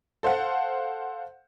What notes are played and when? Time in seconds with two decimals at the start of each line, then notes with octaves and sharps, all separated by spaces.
0.23 A4 C5 F5 F#5